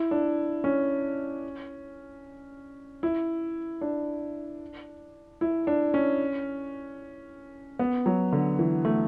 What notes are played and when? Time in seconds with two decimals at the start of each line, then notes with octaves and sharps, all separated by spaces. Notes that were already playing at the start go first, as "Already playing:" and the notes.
Already playing: E4
0.11 D4
0.64 C#4
3.03 E4
3.81 D4
5.41 E4
5.67 D4
5.94 C#4
7.79 B3
8.06 F#3
8.33 D3
8.59 E3
8.85 A3